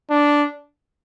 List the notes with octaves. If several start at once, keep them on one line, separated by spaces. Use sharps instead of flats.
D4